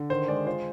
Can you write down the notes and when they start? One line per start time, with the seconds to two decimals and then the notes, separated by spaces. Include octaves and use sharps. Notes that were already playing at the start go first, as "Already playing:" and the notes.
Already playing: D3
0.10 D#3 C5
0.28 G#3 D5
0.46 F4 C5